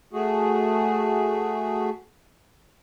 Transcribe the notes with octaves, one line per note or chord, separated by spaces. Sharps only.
A3 F#4 G#4